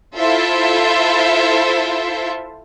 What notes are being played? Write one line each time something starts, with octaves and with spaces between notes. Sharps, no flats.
E4 F4 A4 C5 E5